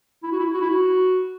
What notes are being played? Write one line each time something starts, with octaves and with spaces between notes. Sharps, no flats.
E4
F#4
E4
F#4
E4
F#4